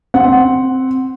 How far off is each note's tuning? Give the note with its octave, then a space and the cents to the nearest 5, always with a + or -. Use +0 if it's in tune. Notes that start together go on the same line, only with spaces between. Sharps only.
C4 +0 F#5 +0